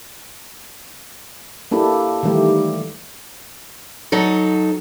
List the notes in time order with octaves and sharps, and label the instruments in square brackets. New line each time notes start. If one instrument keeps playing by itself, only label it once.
[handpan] A#3 D4 E4 G4 A4
D#3 E3 G3 A3 D#4 G4
[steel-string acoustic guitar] F#3 D#4 A4